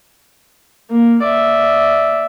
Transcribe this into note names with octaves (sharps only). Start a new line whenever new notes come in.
A#3
D5 E5